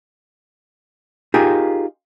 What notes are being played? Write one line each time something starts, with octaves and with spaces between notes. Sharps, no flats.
D#4 F4 G4 G#4 A#4